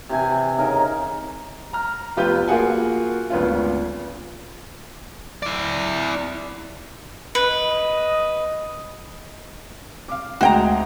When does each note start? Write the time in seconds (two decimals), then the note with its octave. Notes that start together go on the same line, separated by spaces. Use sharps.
0.09 C3 E3 G#5
0.58 C#3 D#4 A#4
1.73 A#5 F6
2.17 F1 B3 F4 G4 B4 G6
2.48 A#3 F4 F#4 G#4 F#5 G#5
3.30 G#1 D2 B3 C#4 F4
5.43 E4 D5
7.35 B4 D#5
10.08 F5 D6
10.41 D2 G#3 F#4 G5 A#5